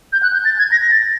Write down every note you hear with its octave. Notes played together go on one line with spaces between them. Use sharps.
G6
F#6
G6
A6
G#6
A#6
A#6
A6